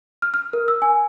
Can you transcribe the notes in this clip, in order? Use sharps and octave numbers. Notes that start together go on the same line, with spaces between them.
F6
F6
A#4
E6
G#5